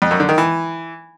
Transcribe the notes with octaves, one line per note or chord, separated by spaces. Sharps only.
F2
F#2
D3
D#3
E3